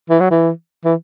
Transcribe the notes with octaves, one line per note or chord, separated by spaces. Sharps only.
E3
F#3
E3
E3